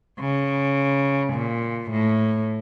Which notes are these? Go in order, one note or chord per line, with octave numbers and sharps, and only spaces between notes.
C#3
A#2
A2